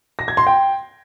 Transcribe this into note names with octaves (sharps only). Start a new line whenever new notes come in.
A#6
G#6
C6
G5